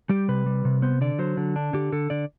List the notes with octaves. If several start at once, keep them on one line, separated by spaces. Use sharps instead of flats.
G3 G4
C3 B4
G3
C3
B3 C5
D3 D5
F#3 C5
D3
D4
D3 G4
D3 A4
D3 D5